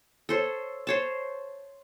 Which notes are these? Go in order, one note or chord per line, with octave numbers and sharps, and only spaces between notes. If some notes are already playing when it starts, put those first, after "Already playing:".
A4 C5 C#5
C5 C#5 A5